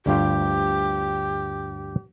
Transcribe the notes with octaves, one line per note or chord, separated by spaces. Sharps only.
D2 G2 F4 G4